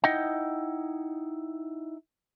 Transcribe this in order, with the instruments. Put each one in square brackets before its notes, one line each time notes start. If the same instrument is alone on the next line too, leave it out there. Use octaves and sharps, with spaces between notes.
[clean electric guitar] D#4 E4 D#5 F#5 G5